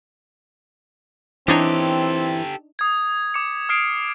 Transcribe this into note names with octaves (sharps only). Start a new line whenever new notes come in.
E3 C4 D4 D#4 G4 A4 C#5
D#6 G#6
D6 C#7
D#6 F6 C7 D7